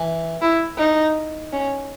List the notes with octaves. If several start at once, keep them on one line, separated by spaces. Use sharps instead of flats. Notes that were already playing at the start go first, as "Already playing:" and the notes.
Already playing: E3
E4
D#4
C#4